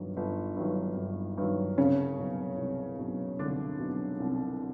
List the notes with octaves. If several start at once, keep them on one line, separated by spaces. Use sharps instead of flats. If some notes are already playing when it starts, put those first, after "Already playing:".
Already playing: G1 G2 D#3 F#3
G1
G2 D#3 F#3
G1
G2 D#3 F#3
C2 C#3 C#4
B2 F#3
C2
B2 F#3
C2 D3 D4
B2 F#3
C2